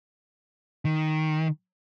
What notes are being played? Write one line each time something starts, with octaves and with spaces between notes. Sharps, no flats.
D#3